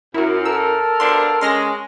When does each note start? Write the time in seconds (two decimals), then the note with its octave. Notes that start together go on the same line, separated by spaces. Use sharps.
0.14 F#2 E4 F#4 A#4
0.46 A4 A#4 E6
1.00 B2 F3 D4 C6
1.41 G#3 C#4 C6 F6 A#6